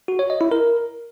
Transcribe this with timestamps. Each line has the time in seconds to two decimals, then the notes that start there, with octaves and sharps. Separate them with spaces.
0.08 F#4
0.19 C#5
0.30 D#5
0.41 E4
0.52 A#4